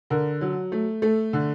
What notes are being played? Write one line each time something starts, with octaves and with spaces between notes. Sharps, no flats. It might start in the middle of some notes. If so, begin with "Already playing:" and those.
D3 A#4
F#3
A3
A3 A4
D3